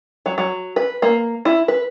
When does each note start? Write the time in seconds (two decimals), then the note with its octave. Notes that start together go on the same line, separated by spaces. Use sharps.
0.26 F#3
0.38 F#3
0.76 B4
1.02 A#3
1.45 E4
1.68 B4